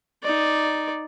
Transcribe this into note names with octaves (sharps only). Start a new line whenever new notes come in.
D#4 D5